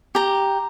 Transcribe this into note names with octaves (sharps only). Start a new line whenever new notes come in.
G4 A#5